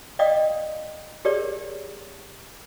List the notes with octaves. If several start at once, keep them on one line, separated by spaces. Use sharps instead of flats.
D5 D#5 F5 G5 D#6
G4 G#4 A#4 C#5 D5